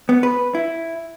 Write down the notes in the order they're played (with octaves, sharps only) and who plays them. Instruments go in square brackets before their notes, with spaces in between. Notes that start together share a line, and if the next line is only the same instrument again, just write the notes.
[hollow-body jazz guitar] B3
B4
E4